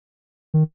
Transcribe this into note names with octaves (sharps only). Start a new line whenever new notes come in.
D#3